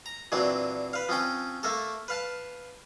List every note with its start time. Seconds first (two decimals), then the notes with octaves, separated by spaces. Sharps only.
0.06 A#5
0.32 A#2 E3 F#3 C4 D4
0.93 B4 F5
1.09 F3 C4 C#4 G5
1.63 A3 A#3 A4
2.08 B4 F5 A5